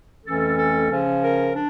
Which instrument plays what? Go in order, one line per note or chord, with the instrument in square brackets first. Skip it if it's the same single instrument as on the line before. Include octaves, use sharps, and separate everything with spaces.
[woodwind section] F2 E3 A3 C#4 A4
A4
C#3 F3 C#4
A#4
D4